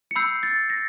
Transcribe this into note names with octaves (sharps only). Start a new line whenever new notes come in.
C#7
B5 E6 G6 C7
A6
A#6